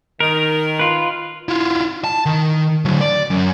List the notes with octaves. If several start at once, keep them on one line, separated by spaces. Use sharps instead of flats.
D#3 A#4
F4 B4
E4 F4
A5
D#3
D3 F#3
D5
F#2